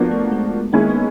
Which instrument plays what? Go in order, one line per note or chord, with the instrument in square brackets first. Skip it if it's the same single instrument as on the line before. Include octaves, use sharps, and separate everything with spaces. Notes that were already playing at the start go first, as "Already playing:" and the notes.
Already playing: [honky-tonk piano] F3 A#3 D4 F#4 [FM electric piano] B3
[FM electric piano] A3
G#3
[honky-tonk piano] D#3 G#3 C#4 E4 G#4 [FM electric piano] A#3
[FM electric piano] B3